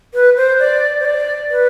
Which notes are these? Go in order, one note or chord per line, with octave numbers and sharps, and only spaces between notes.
B4
C5
D5
C5
D5
B4